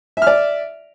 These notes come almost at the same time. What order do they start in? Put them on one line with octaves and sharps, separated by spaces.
E5 F6 D5